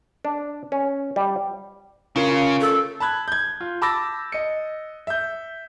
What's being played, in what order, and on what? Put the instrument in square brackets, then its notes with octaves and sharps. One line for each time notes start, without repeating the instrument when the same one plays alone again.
[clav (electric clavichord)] D4
C#4
G3
[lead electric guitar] C#3 [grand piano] C#4 F4 A#4
[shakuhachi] A4
[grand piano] A5 B5 F#6 G#6
G6 G#6
F4
A5 B5 D6 E6 A6 A#6
D#5 C#7
E5 G6